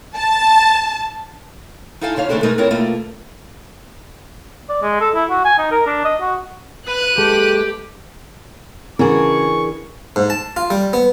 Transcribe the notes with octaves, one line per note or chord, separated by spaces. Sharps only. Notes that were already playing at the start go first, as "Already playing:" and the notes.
A5
D#4 E4 A4 F5 G#5 A5
C#3 F3 C#5 F5
D#2 C#3 A3 D4 A4 C5
B2 G#3 A3 D#4 A#4 D#5
B3 C4 E4 F4 A#4 C#5
B2 A3 A#3 F4
D5
G#3
A4
E4
F#4
G#5
D#4
A#4
D4
D#5
F#4
B4 F#6 D#7
G#3 G4 A4
C#3 E3 D4 F#4 G#4 A#4 C#6
G#2
A5
F4
G3
B3